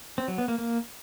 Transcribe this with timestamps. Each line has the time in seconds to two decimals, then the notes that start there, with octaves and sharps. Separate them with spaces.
0.18 C4
0.28 F#3
0.38 B3
0.48 A#3
0.58 A#3